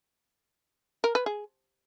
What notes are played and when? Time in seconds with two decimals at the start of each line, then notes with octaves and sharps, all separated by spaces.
1.04 A#4
1.15 B4
1.26 G#4